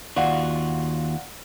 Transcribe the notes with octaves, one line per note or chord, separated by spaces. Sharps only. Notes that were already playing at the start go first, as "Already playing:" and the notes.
D#2 F4 F#4 D5 F5 F#5